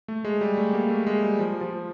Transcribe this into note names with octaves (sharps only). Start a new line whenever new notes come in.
A3
G#3
G3
A3
A#3
A3
G#3
G3
F3
F3